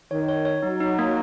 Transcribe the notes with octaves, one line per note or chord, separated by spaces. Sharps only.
D#3 C#5
C#5
C#5
F#3 D#4
D#4
A#3